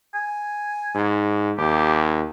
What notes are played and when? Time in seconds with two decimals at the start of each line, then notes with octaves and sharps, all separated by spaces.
0.15 G#5
0.95 G#2
1.58 D#2 G4